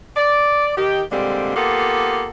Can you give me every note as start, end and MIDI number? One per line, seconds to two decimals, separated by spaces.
0.16 0.73 74
0.77 1.03 51
0.77 1.03 67
1.12 1.53 46
1.12 1.53 50
1.12 1.53 55
1.12 1.53 56
1.12 1.53 60
1.56 2.30 58
1.56 2.30 59
1.56 2.30 65
1.56 2.30 67
1.56 2.30 69